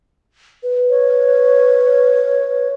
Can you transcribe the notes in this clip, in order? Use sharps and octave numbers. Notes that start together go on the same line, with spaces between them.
B4
C#5